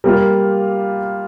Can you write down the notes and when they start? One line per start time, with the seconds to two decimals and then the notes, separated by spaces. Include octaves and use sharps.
0.04 G3 A#3 F4